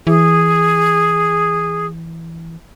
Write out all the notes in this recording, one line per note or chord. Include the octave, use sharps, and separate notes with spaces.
E3 G#4